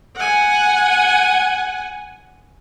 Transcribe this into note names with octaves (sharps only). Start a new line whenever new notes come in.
F#5 G#5